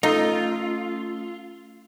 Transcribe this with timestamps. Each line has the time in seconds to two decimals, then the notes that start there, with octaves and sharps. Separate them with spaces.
0.03 A3 C#4 D#4 F4 A4 D#5 D#6 E6